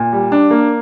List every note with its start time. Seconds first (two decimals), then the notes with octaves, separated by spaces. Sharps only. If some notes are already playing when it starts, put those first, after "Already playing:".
Already playing: A#2
0.13 G3
0.32 D4
0.50 A#3